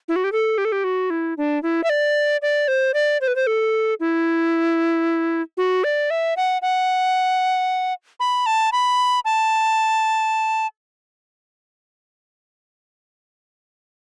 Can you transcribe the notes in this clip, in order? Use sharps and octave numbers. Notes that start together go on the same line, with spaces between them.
E4
F#4
G4
A4
G4
A4
G4
F#4
E4
D4
E4
E5
D5
D5
C5
D5
C5
B4
C5
A4
E4
F#4
D5
E5
F#5
F#5
B5
A5
B5
A5